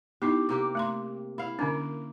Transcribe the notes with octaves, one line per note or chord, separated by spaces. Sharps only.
B3 D#4 E4 G4
C3 A#3 G4
A3 A#5 C6
E4 F5
D3 A#3 C#4 D4